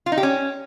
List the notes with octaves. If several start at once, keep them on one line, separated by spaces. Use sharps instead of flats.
F4
D#4
G4
C#4